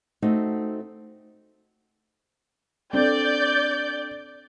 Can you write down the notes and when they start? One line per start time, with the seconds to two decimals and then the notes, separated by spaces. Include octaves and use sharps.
0.22 A3 C4 D#4 F#4
2.93 C4 D4 A4 D5 G6